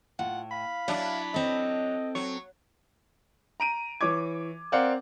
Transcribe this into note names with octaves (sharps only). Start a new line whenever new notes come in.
A2 F4 F#5
F5 B5
F#3 D4 E4
C4 A4 D#5
F#3 C#6
A#5 D7 D#7
E3 C#5 D6 G#6
C4 A#4 D5 F5 F#5